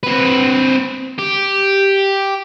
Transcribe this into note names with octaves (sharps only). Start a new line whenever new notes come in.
C4 B4
G4